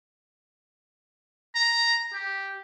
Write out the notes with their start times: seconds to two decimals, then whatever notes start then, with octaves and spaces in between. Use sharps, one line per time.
1.55 A#5
2.13 G4